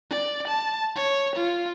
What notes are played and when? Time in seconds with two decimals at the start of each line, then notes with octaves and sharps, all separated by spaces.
0.11 D5
0.47 A5
0.96 C#5
1.35 F4